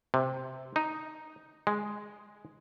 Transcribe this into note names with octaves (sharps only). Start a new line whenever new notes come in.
C3
D#4
G#3